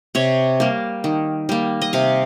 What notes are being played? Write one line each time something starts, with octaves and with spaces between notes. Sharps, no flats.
C3 C#5
G3 A#3
D#3
G3 A#3
D#5
C3 F5